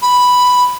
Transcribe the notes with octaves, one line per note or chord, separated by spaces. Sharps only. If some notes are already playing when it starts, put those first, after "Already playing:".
B5